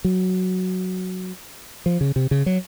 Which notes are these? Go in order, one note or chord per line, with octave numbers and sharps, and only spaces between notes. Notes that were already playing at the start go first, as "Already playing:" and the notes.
F#3
F3
C#3
C3
C#3
F#3